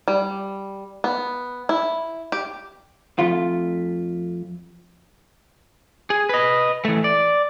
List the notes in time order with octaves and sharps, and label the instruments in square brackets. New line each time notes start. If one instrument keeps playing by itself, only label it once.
[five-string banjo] G3
B3
E4
G4
[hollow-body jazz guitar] F2 A3 F4
[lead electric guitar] G#4
B4 D#5
E3 A3
D5